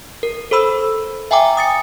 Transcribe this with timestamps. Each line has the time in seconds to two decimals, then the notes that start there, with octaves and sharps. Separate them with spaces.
0.23 A#4
0.51 A4 C5 B5 E6
1.31 E5 G5 G#5 A#5 D6
1.57 D#6 A6 C#7